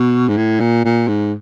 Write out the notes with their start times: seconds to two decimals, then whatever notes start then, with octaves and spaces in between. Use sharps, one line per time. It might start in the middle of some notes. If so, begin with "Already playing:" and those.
Already playing: B2
0.28 G#2
0.37 A2
0.60 A#2
0.84 A#2
1.08 G#2